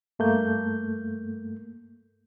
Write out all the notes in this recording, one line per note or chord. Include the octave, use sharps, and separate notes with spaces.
G2 A3 A#3 G6